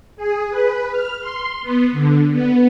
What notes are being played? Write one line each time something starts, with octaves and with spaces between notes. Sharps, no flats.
G#4
B4
F6
C6
B3
D3
B3